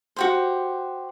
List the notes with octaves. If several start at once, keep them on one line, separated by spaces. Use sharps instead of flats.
F#4 G4 C5